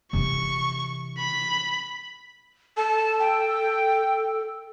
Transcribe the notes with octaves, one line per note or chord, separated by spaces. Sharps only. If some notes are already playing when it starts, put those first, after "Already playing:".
C3 E3 C#6
B5
A4 A5
G5